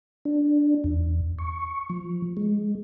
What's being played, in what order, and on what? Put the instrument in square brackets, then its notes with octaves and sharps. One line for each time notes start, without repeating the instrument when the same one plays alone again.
[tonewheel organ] D4
E2
C#6
F3
G#3